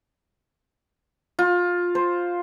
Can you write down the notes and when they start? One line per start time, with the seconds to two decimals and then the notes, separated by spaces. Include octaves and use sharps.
1.39 F4
1.95 C5